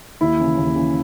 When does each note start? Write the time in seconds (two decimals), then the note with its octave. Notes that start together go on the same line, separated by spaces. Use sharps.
0.21 D#2 E4
0.39 C#3 E3
0.57 D#2
0.76 C#3 E3